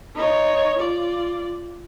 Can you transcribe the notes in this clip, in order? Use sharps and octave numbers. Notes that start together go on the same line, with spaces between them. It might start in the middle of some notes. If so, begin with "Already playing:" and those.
D#4 C#5
F4 D5